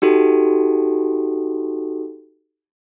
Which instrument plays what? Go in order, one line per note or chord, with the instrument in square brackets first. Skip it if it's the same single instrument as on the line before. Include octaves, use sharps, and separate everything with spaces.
[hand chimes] D#4 F#4 G4 A4